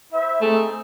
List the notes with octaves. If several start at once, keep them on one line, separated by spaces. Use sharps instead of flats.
E4 C5 E5
A3 C4 D#4 G#4